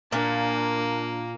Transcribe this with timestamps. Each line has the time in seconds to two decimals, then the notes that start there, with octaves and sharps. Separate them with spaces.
0.12 A#2 A#3 D4